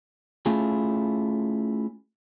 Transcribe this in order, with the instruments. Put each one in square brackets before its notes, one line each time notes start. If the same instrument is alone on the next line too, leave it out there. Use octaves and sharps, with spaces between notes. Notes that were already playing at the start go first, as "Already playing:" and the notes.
[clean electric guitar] A3 C#4 E4 F4 G#4